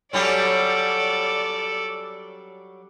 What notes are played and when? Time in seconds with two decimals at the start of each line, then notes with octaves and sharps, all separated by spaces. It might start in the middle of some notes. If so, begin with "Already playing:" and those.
0.13 F#3 G3 C#4 A4 D5